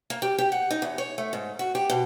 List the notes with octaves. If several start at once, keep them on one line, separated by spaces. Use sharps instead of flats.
A#3
G4
G4
F#5
D#4
E2
C#5
A3
G#2
F#4
G4
B2